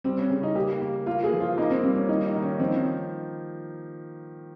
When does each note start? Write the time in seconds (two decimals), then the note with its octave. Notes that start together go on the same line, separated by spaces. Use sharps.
0.04 G3 C4
0.18 C#4
0.30 C#3 C#4
0.43 D#4
0.55 A#3 G4
0.82 A#3
1.06 A#3 F4
1.24 G#4
1.32 F3
1.40 F4
1.58 A#3 D#4
1.70 C4
1.83 G3 C4
1.96 C#4
2.08 D#3 D#4
2.26 D#4
2.35 D#3
2.42 C#4
2.59 F3 C4
2.67 D#4
2.73 C#4